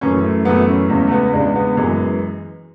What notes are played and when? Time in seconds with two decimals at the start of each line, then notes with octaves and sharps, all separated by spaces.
0.01 F#2 E3 A3 C#4
0.24 A3
0.45 F#2 E3 A3 B3
0.68 C#4
0.90 E2 C#3 G#3 C#4
1.07 A3
1.11 B3
1.33 E2 C#3 G#3 D4
1.55 B3
1.77 F#2 E3 G#3